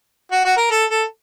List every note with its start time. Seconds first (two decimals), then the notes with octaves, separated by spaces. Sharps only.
0.32 F#4
0.45 F#4
0.57 A#4
0.71 A4
0.90 A4